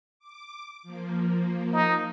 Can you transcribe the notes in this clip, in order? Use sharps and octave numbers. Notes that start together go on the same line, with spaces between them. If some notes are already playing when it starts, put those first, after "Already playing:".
D6
F3 A#3
D#4